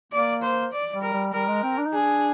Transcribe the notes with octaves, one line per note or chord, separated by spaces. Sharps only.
A#3 D5
C5
D5
G3
A#4
G3
G3 A#4
G#3
C4
D4
D#4
D4 G#4